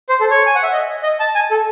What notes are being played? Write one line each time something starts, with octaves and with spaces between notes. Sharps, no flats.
C5
A4
C#5
G#5
F#5
E5
D#5
D#5
A5
G#5
A4